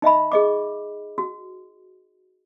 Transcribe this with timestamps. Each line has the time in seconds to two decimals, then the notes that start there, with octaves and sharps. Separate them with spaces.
0.02 D#4 D#5 E5 B5
0.32 G#4 D#5 D6
1.18 F#4